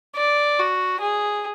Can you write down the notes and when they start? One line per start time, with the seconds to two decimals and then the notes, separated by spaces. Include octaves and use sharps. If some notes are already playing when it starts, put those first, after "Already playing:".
0.16 D5
0.59 F#4
1.01 G#4